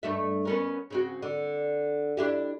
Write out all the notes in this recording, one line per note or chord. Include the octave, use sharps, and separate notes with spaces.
G2 A3 E5
B3 C#4 A#4
C#3 C4 F#4
D3
D4 E4 G4